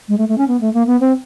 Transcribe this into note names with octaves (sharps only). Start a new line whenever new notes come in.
G#3
A3
A3
C#4
B3
A3
A#3
B3
C4